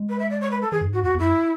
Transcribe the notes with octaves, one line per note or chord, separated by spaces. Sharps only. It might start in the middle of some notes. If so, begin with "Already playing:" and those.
Already playing: G#3
B4
E5
D5
C#5
B4
A4
E3 G#4
F#2
G#2
F#4
E2 F#4
E2
F#2 E4